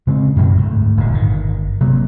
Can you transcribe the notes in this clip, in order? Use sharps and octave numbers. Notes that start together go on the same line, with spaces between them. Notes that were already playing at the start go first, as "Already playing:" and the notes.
C#3 G#3 C4
F#2 B2 D#3 F#3
D2 G#2 A3
D1 A#2 D3
G1 D#3
C3 F#3 A#3